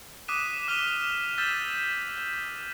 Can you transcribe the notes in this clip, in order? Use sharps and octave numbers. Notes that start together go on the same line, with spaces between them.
D6 D#6 F#6 B6 D#7 E7
D6 F6 B6 D#7 F7 G7
E6 F6 G6 A6 B6 E7